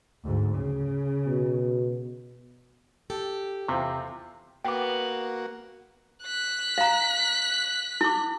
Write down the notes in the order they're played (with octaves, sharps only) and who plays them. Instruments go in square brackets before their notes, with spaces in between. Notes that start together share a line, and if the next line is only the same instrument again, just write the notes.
[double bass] D2 G#2
C#3
[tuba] B2
[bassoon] G4 [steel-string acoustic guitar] A4
[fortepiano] E2 F4 C5 [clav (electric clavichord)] C3
[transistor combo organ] A#3 F#4 [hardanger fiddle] B3 [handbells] G5 D6
[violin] F#6 B6
[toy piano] F5 A#5
E4 D6